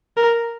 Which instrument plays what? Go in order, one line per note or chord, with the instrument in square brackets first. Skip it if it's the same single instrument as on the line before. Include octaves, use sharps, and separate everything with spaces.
[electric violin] A#4